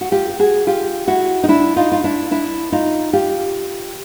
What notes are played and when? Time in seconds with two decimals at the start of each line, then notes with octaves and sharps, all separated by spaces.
0.01 F#4
0.12 F4 G4
0.29 G4
0.39 F#4 G#4
0.67 F4 G4
1.08 E4 F#4
1.43 D#4
1.49 D4 E4
1.76 D#4 F4
1.92 F4
2.04 D4 E4
2.31 D4 E4
2.72 D#4 F4
3.13 F4 G4